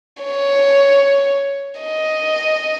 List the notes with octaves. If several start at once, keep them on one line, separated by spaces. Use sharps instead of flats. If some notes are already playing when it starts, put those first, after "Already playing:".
C#5
D#5